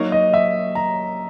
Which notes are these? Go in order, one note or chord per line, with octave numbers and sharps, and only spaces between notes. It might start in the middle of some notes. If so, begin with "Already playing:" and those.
Already playing: F#3 A#3 D#4 A#4 C#5
D#5
E5
A#5